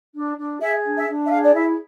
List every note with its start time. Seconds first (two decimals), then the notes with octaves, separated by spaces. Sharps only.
0.13 D4
0.36 D4
0.59 G#4 E5
0.83 D4
0.95 E5
1.07 D4
1.25 E5
1.30 G#4 F5
1.43 D5
1.53 E4 E5